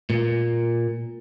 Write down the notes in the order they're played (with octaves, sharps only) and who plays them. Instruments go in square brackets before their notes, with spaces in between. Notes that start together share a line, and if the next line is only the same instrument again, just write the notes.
[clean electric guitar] A#2